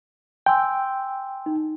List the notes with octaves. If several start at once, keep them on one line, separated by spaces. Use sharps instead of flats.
G5 G#5 C6 E6
D#4